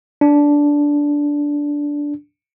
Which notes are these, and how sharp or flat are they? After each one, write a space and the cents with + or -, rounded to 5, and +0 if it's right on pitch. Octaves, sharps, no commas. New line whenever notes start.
D4 -10